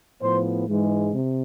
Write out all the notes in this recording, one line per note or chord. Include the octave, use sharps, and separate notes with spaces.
A2 F3 B3 C5
G#2 E3 G#3
C3